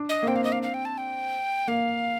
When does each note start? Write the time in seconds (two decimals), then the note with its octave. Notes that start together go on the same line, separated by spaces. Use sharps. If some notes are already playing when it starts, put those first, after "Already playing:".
Already playing: D4
0.09 D#5
0.23 A#3
0.27 C4 G5
0.36 F5
0.44 D#5
0.52 F5
0.63 F5
0.74 G5
0.85 A5
0.98 G5
1.67 A#3 F5